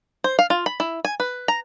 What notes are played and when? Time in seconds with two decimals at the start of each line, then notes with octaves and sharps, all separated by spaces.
0.24 C5
0.39 F5
0.50 F4
0.66 B5
0.80 E4
1.05 G#5
1.20 B4
1.48 A#5